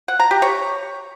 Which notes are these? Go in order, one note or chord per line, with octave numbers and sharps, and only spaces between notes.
F#5
A#5
G4
C#5